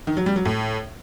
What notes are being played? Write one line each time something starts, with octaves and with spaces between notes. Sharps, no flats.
D#3
F#3
G3
F#3
A2